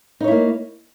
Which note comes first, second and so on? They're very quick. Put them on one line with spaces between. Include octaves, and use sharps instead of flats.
D#4 C#5 E4 A#3